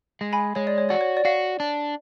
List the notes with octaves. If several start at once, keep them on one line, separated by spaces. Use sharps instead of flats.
G#3
G#5 B5
G#3 C#5
D5
C#5
F#4 D5
C#5
D5
F#4 F5
D4